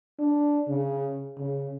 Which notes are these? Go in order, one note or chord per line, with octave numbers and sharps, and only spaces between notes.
D4
C#3
C#3